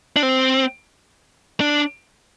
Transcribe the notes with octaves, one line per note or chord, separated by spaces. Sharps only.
D4
C4
D4